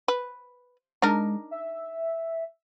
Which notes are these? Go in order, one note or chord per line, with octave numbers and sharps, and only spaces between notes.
B4
G#3 D4 D#4 A#4
E5